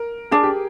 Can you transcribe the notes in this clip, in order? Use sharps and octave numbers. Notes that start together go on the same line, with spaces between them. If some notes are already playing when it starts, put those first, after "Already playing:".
Already playing: A#4
D4 G#4
G4